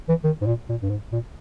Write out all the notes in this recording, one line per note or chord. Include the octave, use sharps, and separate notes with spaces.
E3
D#3
G#2
A#2
A#2
G2
G#2
A#2